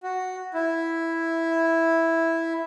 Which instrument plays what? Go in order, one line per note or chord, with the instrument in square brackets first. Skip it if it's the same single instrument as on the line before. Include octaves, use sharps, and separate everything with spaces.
[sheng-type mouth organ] F#4
E4